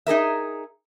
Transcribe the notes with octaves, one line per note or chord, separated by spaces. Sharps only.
D#4 G#4 A#4 E5